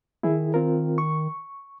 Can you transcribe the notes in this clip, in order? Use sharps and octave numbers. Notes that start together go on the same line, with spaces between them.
D#3 E4 G#4
C4 F4 A#4
C#6